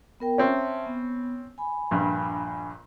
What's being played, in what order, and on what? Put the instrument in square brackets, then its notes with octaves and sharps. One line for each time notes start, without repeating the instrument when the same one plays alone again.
[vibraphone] B3 A#4 G5
[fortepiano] C4 C#4 [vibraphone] E5 A5 C6
[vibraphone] B3
G#5 B5
[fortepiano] A#1 G2